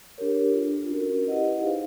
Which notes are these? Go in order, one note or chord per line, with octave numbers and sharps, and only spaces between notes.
D4 G4 A#4 C#5
D4 F4 A4
C#4 F#4 A#4
E4 G4 B4 D#5 F#5
D#4 G#4 C5 F5